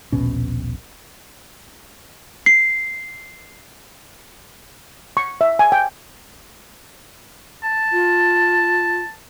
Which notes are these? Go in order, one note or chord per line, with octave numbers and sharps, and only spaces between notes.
D#1 A#1 B2 C#4
C7
C#6
E5
G#5
G5
A5
F4